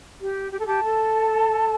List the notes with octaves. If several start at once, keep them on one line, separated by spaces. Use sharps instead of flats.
G4
G4
A4
G4 A5
A4